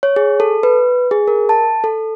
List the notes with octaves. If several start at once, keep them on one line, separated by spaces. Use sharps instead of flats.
C#5
G#4
A4
B4
G#4
A#4
A5
A4